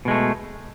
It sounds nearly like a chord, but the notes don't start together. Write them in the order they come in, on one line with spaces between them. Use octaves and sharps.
B2 G#3 A3